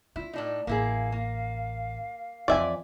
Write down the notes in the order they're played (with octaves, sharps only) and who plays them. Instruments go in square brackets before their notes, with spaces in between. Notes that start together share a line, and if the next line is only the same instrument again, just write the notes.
[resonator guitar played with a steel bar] E4 [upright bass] F4
[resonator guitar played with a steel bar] A2 D4 D#4
[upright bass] A1 [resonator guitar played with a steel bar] A#3 E4 G#4 [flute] F5
[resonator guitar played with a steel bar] A#3
[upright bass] F2 E3 [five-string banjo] D5 E5 G#5